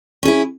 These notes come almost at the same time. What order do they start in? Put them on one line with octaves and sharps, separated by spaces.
C#4 G#4 E4